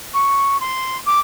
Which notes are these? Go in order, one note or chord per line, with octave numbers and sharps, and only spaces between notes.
C#6
C6
D6